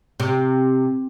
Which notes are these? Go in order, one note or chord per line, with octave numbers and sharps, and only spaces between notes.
C3